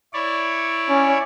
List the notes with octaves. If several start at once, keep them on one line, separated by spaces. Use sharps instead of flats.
E4 C#5 D5
C#4